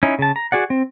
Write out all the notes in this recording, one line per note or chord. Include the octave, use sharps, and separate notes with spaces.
C#4 D#4 E4
C#3 A5
A#5
F#4 G#4 D5 F#5
C4